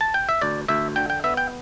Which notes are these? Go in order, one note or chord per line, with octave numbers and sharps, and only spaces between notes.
A5
G5
E5
D2 D5
D2 E5
D3 G5
G5
B3 E5
G5